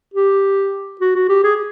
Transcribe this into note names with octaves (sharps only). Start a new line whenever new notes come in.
G4
F#4
F#4
G4
G#4